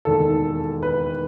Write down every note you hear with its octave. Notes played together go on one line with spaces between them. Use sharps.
E1 D#2 D#3 A4
B4